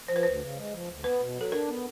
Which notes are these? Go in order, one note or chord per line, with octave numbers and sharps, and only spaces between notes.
F3 C5
B4
D2 C5
C#3
G#3
F3
D2
B3 B4
B2
F#3
A4
D4 A#4
B3